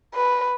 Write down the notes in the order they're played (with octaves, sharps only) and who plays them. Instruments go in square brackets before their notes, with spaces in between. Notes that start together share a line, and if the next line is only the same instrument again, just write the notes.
[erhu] B4